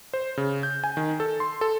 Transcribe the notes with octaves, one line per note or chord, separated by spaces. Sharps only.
C5
C#3
G6
G#5
D#3
A4
C6
A4